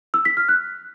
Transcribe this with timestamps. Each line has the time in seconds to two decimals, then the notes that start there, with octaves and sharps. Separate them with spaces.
0.14 E6
0.25 B6
0.37 F6
0.49 F#6